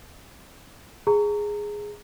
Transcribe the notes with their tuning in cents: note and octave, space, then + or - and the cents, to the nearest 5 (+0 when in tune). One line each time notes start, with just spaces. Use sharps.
G#4 +0 A#5 -20